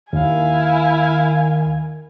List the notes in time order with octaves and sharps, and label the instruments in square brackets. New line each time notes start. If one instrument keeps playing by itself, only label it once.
[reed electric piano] D#2 [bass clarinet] D#3 [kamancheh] E4 F5 [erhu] G#5